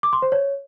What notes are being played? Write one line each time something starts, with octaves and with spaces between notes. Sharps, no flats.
D6
C6
C5
C#5